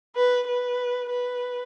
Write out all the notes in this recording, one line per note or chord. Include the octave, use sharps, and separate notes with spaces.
B4
B4
B4